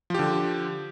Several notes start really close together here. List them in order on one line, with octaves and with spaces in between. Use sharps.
F3 G4 D3